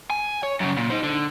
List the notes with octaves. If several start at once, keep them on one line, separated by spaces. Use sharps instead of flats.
G#5
C#5
F#2 C#3
A#2
D#4 C5
D3